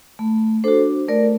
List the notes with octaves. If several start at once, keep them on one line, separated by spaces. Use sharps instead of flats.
A3
D4 F#4 A4 C5
A3 A#4 D5